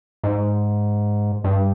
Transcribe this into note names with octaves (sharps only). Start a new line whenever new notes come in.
G#2
G2